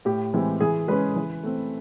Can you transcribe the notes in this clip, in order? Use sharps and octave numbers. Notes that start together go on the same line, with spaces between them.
A2 G4
E3 G#3 C4
E3 G#4
G#3 C#4 B4
E3
A3 C4